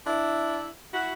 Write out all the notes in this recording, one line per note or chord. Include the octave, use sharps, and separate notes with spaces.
D4 E4
E4 F#4